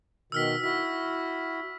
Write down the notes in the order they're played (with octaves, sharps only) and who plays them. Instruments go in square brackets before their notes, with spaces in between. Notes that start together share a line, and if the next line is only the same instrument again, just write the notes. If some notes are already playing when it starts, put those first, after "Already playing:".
[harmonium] B2 D#3 [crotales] E6 F6 B6
[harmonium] E4 F#4 [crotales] B6